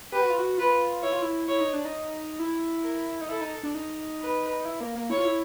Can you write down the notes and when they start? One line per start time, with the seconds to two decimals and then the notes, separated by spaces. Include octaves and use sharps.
0.12 G4 B4
0.21 F#4
0.30 F4
0.39 F#4
0.58 F4 B4
1.03 E4 C#5
1.12 F4
1.22 E4
1.48 E4 C#5
1.61 D#4
1.73 D4
1.85 D#4
2.39 E4
2.83 A#4
3.21 D#4
3.29 E4 A4
3.41 D#4
3.63 D4
3.75 D#4
4.20 B4
4.65 E4
4.81 A#3
4.95 A#3
5.10 E4 C#5
5.18 F4
5.25 E4